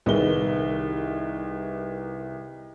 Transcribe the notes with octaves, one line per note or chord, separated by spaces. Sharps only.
C2 D#3 G#4 B4 G7